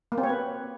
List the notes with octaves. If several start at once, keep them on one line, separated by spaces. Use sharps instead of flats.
A#3
C4
C#5
B4